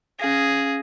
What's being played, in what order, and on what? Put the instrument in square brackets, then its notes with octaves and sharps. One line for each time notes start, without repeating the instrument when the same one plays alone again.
[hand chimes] C#4 F5 A#6 [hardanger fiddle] G#4